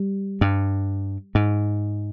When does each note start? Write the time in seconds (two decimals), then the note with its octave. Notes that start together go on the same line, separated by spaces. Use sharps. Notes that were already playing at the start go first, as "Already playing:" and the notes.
Already playing: G3
0.41 G2
1.35 G#2